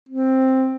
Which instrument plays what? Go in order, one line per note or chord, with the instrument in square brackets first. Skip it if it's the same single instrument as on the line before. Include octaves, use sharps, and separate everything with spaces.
[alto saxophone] C4